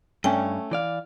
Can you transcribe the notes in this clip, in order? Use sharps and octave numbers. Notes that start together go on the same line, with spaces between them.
G2 A3 C#4 G5
E3 D5 F5